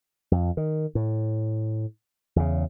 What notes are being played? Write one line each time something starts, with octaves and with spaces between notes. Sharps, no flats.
F2
D#3
A2
E2 C#3